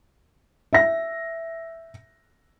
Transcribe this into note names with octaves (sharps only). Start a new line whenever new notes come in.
E5 A#6